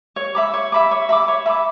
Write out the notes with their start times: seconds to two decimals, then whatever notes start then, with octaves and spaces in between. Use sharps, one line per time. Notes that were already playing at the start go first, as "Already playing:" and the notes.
0.16 C#5
0.35 E5 B5 D6
0.54 C#5
0.72 E5 B5 D6
0.91 C#5
1.09 E5 B5 D6
1.28 C#5
1.46 E5 B5 D6